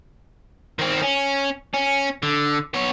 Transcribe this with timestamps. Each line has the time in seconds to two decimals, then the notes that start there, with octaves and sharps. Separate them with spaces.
0.79 D#3 C4
1.02 C#4
1.74 C#4
2.23 D3
2.74 B3 C#5